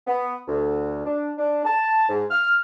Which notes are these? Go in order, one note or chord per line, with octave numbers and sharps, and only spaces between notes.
B3
D2
D4
D4
A5
G#2
F6